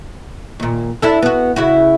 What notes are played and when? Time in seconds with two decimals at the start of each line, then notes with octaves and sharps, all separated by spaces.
0.60 D#2 A#2
1.02 D4 E4 A4
1.22 B3 F#4
1.56 C#3 E4 F#4